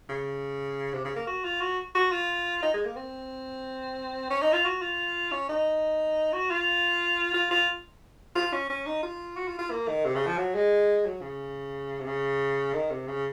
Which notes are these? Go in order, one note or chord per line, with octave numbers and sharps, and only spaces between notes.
C#3
C3
C#3
A#3
F#4
F4
F#4
F#4
F4
D#4
G#3
A#3
C4
C#4
D#4
F4
F#4
F4
C#4
D#4
F#4
F4
F4
F4
F4
C#4
C#4
D#4
F4
F#4
F4
F4
A#3
D#3
C3
C#3
F3
F#3
G#3
F#3
C#3
C3
C#3
D#3
C3
C#3